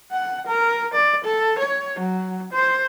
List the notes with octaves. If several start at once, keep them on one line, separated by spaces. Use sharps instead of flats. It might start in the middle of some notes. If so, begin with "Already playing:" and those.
F#5
A#4
D5
A4
C#5
F#3
C5